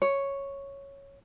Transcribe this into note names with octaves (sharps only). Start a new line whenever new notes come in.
C#5